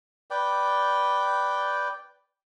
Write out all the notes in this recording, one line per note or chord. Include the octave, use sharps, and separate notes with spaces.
B4 D5 G5